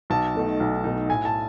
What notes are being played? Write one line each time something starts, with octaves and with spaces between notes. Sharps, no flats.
B1 A5
B2 A3 D#4
B1
B2 A3 D#4
A2 G#5
A5